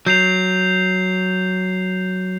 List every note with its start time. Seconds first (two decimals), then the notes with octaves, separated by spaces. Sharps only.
0.06 F#3 G6 C7 F7